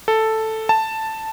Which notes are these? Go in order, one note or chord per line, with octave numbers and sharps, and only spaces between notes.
A4
A5